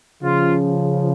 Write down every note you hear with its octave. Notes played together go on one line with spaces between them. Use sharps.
C#3 F3 F4